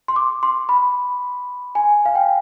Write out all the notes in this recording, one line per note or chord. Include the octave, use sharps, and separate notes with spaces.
C6
D6
C6
B5
G#5
F5
G5